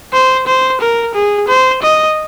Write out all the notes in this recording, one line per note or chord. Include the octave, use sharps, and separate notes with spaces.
C5
C5
A#4
G#4
C5
D#5